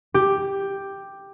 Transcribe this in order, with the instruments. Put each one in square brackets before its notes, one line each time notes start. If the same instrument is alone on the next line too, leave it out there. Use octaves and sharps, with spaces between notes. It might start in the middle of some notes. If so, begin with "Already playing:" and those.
[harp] G4